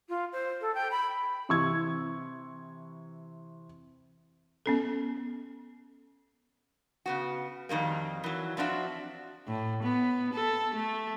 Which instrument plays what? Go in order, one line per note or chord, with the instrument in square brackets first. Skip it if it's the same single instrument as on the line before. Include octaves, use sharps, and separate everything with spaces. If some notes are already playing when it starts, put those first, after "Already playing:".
[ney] F4
C5
A4
G5
B5
[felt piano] C3 E3 C#6 E6 G#6
[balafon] B3 C#4 A4
[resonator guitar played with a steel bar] C#3 B3 F#4
F2 D#3 G3 A#3
E3 F#3
F3 C4 D4 F#4 E5
[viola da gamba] A2
B3
A4
A3